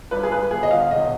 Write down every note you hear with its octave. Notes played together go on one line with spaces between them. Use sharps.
G2 B4
G#4
G2 B4
G1 G#4
D#5
G1 F5
B1 D#5